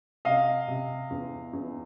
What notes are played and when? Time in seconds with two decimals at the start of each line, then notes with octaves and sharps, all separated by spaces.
0.25 C3 D#5 F5
0.68 C3
1.10 E2
1.53 E2